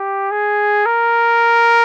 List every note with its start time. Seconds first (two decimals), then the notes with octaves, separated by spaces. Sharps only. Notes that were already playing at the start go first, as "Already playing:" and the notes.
Already playing: G4
0.31 G#4
0.86 A#4